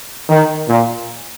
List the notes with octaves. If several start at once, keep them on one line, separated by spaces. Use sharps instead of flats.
D#3
A#2